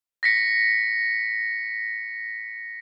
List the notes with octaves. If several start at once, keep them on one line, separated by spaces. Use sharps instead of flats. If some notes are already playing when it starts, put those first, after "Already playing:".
A#6 B6 C#7